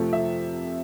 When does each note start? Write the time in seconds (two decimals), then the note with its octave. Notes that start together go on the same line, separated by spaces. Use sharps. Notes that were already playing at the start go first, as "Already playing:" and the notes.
Already playing: F2 C3 F3 A3
0.13 E5